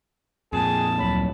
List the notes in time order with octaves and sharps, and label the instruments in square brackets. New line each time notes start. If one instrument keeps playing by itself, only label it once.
[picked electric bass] F2 A#2 [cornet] G#4 [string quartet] A5
[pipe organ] D2 F#3 [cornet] B5